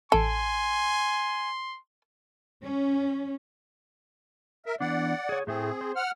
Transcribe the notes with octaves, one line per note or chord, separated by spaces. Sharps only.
A1 A4 G#5 C6 D7 E7
C#4
A#4 E5
E3 B3 D4 D5 F#5
G#4 C#5
A2 A3 C4 E4 G#4
C5
F#5 F6